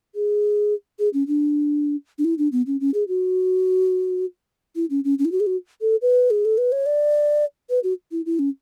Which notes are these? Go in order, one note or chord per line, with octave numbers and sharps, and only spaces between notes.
G#4
G#4
C#4
D4
D4
E4
D4
B3
C#4
C#4
G#4
F#4
E4
C#4
C#4
C#4
E4
F#4
G#4
F#4
A4
B4
G#4
A4
B4
C#5
D5
B4
F#4
E4
E4
C#4